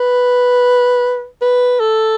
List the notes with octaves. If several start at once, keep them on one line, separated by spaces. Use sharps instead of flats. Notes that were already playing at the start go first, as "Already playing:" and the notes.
Already playing: B4
B4
A4